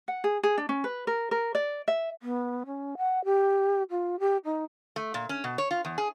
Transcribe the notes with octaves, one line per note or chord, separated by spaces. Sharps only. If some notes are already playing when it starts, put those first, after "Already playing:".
F#5
G#4
G#4
D4
C#4
B4
A#4
A#4
D5
E5
B3
C#4
F#5
G4
F4
G4
D#4
A3
A#2
C#4
B2
C#5
F4
E2
G#4